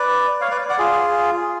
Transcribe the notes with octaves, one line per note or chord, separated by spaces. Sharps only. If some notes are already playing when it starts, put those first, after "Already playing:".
Already playing: B4 D5
C#5 F5
B4 D5
D5 F#5
F4 G#4